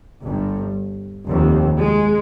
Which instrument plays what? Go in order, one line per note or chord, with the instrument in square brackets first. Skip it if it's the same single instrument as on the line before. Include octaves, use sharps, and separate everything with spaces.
[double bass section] G1 G2
F1 D#2
G#3